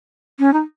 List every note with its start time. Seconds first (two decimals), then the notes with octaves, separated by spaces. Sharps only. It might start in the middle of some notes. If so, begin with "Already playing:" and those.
0.39 C#4
0.53 D#4